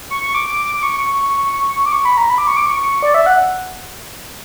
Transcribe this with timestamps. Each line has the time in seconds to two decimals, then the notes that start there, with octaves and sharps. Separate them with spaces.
0.10 C#6
0.22 C#6
0.34 D6
0.47 D6
0.65 D6
0.75 D6
0.83 C#6
1.85 D6
1.92 C#6
2.05 B5
2.17 A#5
2.30 B5
2.38 D6
2.48 C#6
2.57 D6
2.66 C#6
3.03 D5
3.14 E5
3.26 F#5